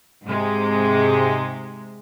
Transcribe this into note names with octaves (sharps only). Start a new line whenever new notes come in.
G#2 C3 G#3